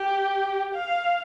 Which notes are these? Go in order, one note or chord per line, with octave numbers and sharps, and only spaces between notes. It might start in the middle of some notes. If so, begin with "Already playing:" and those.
Already playing: G4
F5